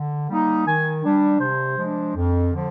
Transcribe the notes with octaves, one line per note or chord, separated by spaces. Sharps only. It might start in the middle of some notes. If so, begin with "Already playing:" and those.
Already playing: D3
G3 A#3 D#4
D#3 G#5
G3 D4
C3 C5
F3 G#3 D4
F2
D3 F3